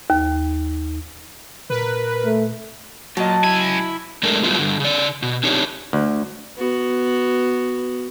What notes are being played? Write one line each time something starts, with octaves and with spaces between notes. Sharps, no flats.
D#2
A#2 A#4 B4
A3
A#2 F#3 D#5 A5
C#2 E4 G#5
A2 G#3 A3 D4 A#4
A2 F#3 G3 B3 D#4 F4
G2 D3
C#3 D5
B2
C4 D4 D#4 G4 C#5
D2
B3 F#4